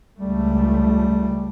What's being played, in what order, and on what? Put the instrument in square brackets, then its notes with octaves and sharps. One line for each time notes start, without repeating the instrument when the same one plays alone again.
[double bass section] C#2 A3 [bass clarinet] G3